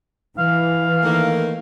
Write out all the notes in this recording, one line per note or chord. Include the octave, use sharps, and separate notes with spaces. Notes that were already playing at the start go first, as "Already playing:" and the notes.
E3 F5
D#3 A3 A#3